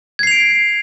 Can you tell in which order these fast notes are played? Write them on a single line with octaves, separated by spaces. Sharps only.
G#6 C7 F7 D7